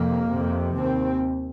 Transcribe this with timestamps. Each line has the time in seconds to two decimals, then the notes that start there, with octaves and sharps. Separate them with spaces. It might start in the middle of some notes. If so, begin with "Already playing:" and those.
Already playing: F2 C3 A#3
0.30 F2 C3
0.77 D#2 C4